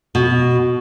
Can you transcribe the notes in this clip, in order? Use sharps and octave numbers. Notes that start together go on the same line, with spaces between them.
B2